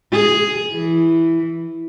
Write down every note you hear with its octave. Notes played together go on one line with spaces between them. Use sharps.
G#4
E3